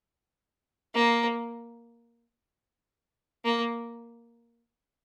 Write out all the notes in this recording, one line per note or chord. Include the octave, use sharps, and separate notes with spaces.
A#3
A#3